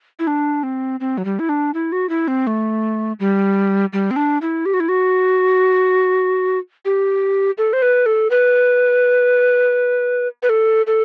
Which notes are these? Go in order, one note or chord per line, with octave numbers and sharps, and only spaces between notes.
E4
D4
C4
C4
F#3
G3
E4
D4
E4
F#4
E4
C4
A3
G3
G3
C4
D4
E4
G4
F#4
E4
F#4
G4
A4
C5
B4
A4
B4
B4
A4
A4